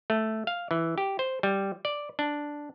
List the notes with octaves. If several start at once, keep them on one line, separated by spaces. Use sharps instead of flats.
A3
F5
E3
G4
C5
G3
D5
D4